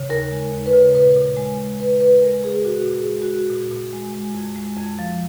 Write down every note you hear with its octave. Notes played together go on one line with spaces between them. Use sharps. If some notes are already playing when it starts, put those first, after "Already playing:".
Already playing: C#3
D#2 A#4
G#3
D#2
B4
C#3
A#2 B4
A#2
G#3
G#3
A#2 B4
A#2 B4
G#3 A#4
G#3 G#4
A#2 F#4
A#2
G#4
G#3
F#4
G#3
A#2
A#2
G#3
G#3
F2
G#3
F2
F3